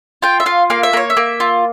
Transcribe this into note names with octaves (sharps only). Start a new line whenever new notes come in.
F4 G5
E5
F4 F5
A#3 F5
E5
A#3 C#5
E5
A#3
F4